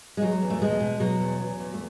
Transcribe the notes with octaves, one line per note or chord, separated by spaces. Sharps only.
G#3
E2 F#3
E2
A3
B2 G#3
B2
B2 F#3
E2
E2
E2
A3